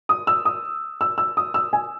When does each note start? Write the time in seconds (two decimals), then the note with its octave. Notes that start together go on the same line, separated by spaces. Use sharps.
0.09 D#6
0.27 E6
0.45 D#6
1.01 E6
1.18 E6
1.37 D#6
1.54 E6
1.73 G#5